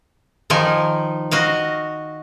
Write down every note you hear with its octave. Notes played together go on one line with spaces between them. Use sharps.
D#3 F3 D#4 G#5
F#4 D#5 F5